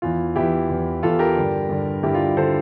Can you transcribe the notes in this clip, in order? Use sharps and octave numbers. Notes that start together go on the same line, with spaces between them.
E2 E3 F4
E2 E3 E4 G4
E2 E3
E2 E3 F4 A4
G4 A#4
G2 D3
G2 D3
G2 D3 E4 G4
F4
D3 A4 C5